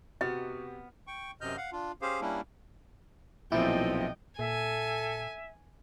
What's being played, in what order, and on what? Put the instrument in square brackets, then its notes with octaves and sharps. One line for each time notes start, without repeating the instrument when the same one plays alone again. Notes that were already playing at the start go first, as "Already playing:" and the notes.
[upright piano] C3 G4 F6 [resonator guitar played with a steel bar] B3 [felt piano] F#4 [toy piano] D#5
[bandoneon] G5 C#6
F#2 C3 D#5 F6 G6
F5 F#5
D4 F4
C#4 G4 G#4 C5 F5
G3 A#3 C#4 D4 E4
[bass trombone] B1 [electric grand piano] A#2 F3 C4 [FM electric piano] E4 [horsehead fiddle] D#5 G5
[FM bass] A#2 [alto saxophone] A4 [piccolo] E5 [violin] G#5